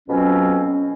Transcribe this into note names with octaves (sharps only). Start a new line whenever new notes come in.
F2 B2 F#3 C4 C#4